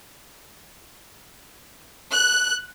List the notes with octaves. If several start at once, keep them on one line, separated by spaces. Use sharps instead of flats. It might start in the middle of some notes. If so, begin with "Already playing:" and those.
F#6